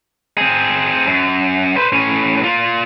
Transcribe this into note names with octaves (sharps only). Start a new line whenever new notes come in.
C4 G#4
F#2
B4 C5
A2 C#4
A#3 F4